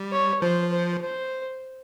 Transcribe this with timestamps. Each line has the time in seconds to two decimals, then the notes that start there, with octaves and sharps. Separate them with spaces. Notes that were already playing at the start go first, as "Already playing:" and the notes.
Already playing: G3
0.12 C#5
0.42 F3 C5
0.72 C5
1.02 C5